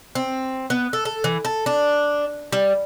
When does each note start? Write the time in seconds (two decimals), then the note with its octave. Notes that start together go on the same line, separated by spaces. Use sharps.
0.15 C4
0.70 B3
0.93 A4
1.05 A4
1.24 E3
1.45 A4
1.66 D4
2.52 G3